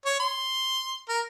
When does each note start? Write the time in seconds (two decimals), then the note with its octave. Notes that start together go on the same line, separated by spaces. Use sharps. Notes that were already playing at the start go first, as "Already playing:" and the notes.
0.06 C#5
0.20 C6
1.09 A#4